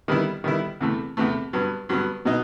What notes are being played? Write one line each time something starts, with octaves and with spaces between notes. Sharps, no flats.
D#3 G3 B3 E4
D#3 G3 B3 E4
E2 C3 E3 A3
E2 C3 E3 A3
G2 F#3 B3
G2 F#3 B3
B2 F#3 B3 D#4